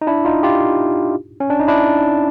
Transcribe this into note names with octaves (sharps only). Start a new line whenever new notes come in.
D#4
D4 E4
D#4 F4
F4 G4
C#4
D4
D#4
D4 E4